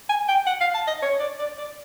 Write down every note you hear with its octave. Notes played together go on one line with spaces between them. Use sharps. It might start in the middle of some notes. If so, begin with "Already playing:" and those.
G#5
G5
F#5
F5
A5
D#5
C#5
D5
D5
D5